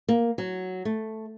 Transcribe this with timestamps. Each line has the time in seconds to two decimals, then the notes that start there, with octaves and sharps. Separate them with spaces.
0.09 A#3
0.38 F#3
0.85 A3